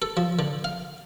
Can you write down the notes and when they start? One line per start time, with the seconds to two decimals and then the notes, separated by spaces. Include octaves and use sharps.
0.02 A4
0.17 F3
0.39 D3
0.64 F5